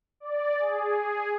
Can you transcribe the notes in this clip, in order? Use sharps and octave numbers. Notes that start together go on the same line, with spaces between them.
D5
G#4